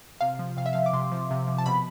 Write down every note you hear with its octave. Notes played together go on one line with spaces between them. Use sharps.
C3 F5
F3
C3 F5
E5
F3 F5
D6
C3 C6
F3
C3
F3
A5
B2 B5